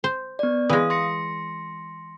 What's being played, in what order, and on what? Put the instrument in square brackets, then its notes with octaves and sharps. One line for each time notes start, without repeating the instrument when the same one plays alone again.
[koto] C5
[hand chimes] B3 D5
[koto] E3 G#3 [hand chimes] F5 D#6
[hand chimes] C6 A#6 C#7